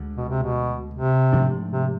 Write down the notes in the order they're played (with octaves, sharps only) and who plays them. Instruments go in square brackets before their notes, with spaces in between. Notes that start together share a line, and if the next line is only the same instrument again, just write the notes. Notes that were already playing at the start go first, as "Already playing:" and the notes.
Already playing: [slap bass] D2 D3 G#3
[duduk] B2
C3
B2
C3
[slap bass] G#2 F3 A3 D4
[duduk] C3